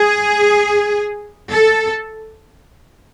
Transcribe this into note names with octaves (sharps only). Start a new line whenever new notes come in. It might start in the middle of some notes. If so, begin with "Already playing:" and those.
Already playing: G#4
A4